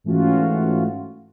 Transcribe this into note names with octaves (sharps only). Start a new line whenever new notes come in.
G#2 E3 A3 C#4 F4 F#4